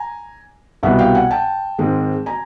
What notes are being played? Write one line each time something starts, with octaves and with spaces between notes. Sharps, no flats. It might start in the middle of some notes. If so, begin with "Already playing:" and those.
Already playing: G#5 A#5
C2 B2 G3 B3 E5 F#5
F5 G5
F#5 G#5
G5 A5
G#2 D#3 G#3 C4
G#5 A#5